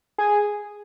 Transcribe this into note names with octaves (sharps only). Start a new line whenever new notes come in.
G#4